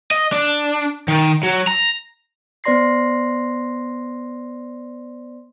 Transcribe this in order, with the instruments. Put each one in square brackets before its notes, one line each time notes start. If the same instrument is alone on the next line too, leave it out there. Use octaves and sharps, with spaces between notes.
[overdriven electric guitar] D#5
D4
D#3
F#3
A#5
[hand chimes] B3 C5 D5 C6 A#6 C7